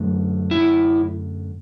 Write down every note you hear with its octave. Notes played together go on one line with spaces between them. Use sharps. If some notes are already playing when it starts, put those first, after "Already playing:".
Already playing: F#2 D3 A3
E4